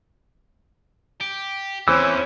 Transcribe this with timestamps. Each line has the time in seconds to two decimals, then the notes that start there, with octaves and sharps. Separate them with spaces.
1.21 G4
1.88 E2 E3 C4 C#4 E4 C5 E6